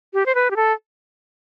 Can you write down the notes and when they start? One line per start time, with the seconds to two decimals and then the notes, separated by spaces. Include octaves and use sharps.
0.14 G4
0.26 C5
0.35 B4
0.51 G4
0.56 A4